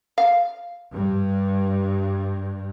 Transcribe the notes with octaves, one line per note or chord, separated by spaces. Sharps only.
F5
G2